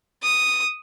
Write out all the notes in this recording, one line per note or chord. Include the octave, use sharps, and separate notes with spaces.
D#6